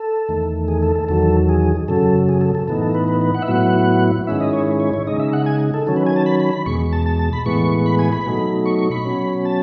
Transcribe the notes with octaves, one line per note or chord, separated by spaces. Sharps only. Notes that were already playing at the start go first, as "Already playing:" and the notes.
Already playing: A4
E2 D#3 A3
G#4
A4
A4
E2 D#3 F#3 A4
G#4
F#2 C#3 F#3 A4
G#4
A4
A4
A2 E3 B3 D#4 A4
A4
B4
B4
B4
F#5
E5
A2 F#3 B3 E4 F#5
G#2 D#3 G#3 C#4 E4 E5
D#5
C#5
C#5
C#5
C#3 G#3 D#4 D#5
E5
F#5
G#5
A4
D#3 F#3 C#4 A4
B4
G#5
A5
B5
B5
B5
E2 B2 G#3 C#6
A5
A5
A5
B5
A2 E3 G#3 B3 C#6
B5
G#5
B5
B2 F#3 A3 D#4
C#6
C#6
B5
B2 F#3 C#4
A5